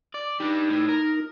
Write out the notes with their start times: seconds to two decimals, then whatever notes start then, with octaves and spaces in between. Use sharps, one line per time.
0.14 D5
0.40 G3 D4 D#4
0.70 A2
0.88 A#4